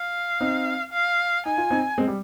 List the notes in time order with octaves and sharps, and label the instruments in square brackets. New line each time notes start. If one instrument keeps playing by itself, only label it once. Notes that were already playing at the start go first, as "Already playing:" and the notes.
Already playing: [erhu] F5
[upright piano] C4 D#4
[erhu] F5
[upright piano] D#4 [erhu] G#5
[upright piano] F4
C4 D#4
G#3 C4
G3